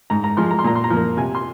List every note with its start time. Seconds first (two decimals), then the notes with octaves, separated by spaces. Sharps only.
0.10 G#2 A#5
0.24 A#5
0.37 F3 G#3 C6
0.51 A#5
0.59 C6
0.64 A#2 A#5
0.75 C6
0.84 A#5
0.90 F3 A#3
1.17 C3 G#5
1.35 C6